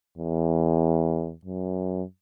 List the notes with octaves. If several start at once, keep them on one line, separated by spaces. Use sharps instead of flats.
E2
F#2